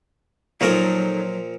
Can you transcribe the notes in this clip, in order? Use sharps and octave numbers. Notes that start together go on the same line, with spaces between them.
A#2 F3 F#3 D#4 A4 A#4 C#5